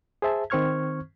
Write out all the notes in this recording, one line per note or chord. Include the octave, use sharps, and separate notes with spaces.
G#4 C5 E5 A5
D#3 C4 C5 C#6 F6 G#6